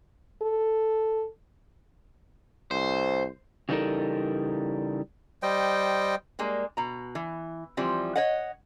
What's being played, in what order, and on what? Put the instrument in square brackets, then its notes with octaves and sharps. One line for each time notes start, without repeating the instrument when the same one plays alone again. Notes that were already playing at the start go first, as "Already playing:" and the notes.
[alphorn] A4
[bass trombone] C2 [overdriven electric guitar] C5
[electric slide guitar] C#3 E3 G3 D#4 A4 A#4
[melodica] G3 C5 D#5 G5
[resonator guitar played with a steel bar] G3 G#3 A#3
B2 A#5
E3
E3 F3 G3 C4
C#5 D#5 F#5